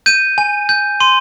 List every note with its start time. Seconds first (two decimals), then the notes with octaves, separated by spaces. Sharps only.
0.06 G6 D#7
0.38 G#5
0.69 G6
1.00 C6 D#7